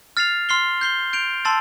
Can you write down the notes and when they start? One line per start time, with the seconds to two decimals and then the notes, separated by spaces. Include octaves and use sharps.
0.17 F6 A6 C7 F7
0.49 C6 F6 C7 G7
0.81 G6 C7 G7
1.13 G6 D7 F7
1.45 A5 C6 E6 A6